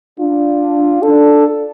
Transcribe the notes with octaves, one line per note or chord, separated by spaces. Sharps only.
D4 F4
D4 A4